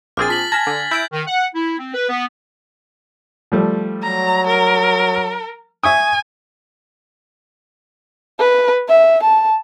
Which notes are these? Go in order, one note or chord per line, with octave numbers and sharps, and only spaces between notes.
A#1 C4 G#4 D6 F6 A6
F4 A5 F6 B6 F#7
G#5 A5 F6 G#6 A#6 B6
D3
E4 G6 B6 D7
D#3
F#5
E4
C4
B4
B3
F3 G3 A3
F#3 A#5
A#4
E5 G#5 C#6 D#6
B4
E5
A5